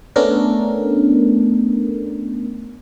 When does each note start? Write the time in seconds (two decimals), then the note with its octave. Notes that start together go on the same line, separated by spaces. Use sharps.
0.16 A3 B3 C#4 D4 A4 A#4